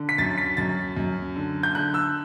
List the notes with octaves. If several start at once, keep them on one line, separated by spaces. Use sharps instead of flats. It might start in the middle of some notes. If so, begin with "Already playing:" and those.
Already playing: D3
B6
F#2 A6
B6
F#2 A6
F#2
D3
G6
D3 F#6
E6